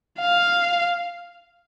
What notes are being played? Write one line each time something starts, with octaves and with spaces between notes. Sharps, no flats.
F5